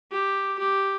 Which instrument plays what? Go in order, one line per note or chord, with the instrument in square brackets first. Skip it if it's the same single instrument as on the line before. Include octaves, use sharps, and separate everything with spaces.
[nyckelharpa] G4
G4